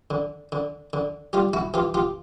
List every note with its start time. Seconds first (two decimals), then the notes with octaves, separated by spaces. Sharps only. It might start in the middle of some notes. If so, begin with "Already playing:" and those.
0.10 D3
0.52 D3
0.93 D3
1.33 G3 F4 G4
1.53 E4 F#4
1.74 E3 F4 G4
1.94 F4 G4